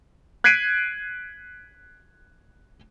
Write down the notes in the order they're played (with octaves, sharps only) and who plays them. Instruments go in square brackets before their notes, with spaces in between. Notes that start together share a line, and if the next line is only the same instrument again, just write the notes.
[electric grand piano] F#6 G#6 B6 C7 D7 D#7